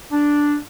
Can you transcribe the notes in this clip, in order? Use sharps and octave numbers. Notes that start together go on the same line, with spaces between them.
D4